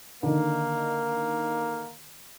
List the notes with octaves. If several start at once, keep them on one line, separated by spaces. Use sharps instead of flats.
D3 D#3 A#3